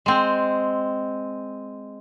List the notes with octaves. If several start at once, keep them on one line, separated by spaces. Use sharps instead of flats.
G#3 C4